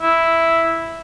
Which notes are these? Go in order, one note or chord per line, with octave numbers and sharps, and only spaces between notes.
E4